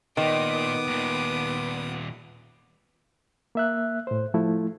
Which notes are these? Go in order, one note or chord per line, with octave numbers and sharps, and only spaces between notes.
A#2 D#3 B3 D6 D#6
D#2 A#2
A#3 E5 F#6
A2 C5
F3 A3 E4